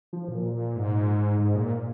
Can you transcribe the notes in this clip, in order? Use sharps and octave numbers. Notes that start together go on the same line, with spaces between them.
F3
A#2
G#2
G#2
A#2